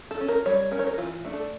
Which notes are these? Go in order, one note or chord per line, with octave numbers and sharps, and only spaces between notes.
A4
C#4
A#4
G3 C#5
C#4 A#4
C#5
A#4
E3 F4
A3 D4
A4